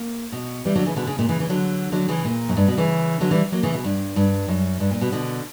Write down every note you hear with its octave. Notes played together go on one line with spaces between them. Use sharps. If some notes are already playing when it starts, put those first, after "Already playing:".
Already playing: A#3
B2
E3 G3
D3 F#3
C#3 E3
B2 D3
C#3
A#2
C#3 E3
C#3 E3
D3 F#3
D3 F#3
C#3 E3
A#2
F#2
G2
B2
C#3 E3
D3 F#3
E3 G3
F#3 A#3
C#3 E3
B2
G2
G2
F#2
G2
A#2
B2
B2 D3